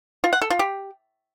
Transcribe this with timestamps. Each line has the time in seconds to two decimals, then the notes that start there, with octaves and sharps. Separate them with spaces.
0.24 F4
0.33 F#5
0.42 A4
0.50 F4
0.59 G4